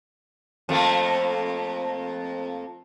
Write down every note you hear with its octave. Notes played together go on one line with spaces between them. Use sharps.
F2 A3 A#3